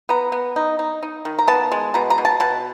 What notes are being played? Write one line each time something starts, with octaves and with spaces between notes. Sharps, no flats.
B3 A#5
B3
D#4
D#4
D#4
D#3
A#5
B3 A5
G#3
B2 A#5
A#5
B2
A5
B2 A5